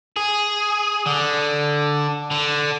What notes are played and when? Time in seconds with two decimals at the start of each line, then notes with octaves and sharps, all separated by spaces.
0.17 G#4
1.06 D3
2.30 D3